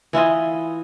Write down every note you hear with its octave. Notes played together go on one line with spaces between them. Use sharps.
E3 E4 F4 D#5